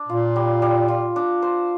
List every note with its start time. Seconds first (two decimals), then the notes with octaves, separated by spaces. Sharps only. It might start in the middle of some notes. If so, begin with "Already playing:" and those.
Already playing: D4
0.09 A#2 F4
0.36 G3
0.62 G3
0.88 F4
1.16 D4
1.42 C5